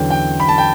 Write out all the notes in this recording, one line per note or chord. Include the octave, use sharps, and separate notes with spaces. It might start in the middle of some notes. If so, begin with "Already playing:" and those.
Already playing: E2 D3 F#3 C#4 G5
G5
B5
A5
G5